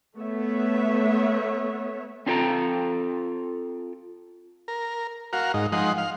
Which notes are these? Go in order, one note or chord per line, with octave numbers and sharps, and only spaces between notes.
A3 B3 C#5 E5
C4 D4 F4 A4 G5 A#5
A#4
F#4 A#4 F5
G#2 D#4
F3 G#3 D#4 F#5 C6
F5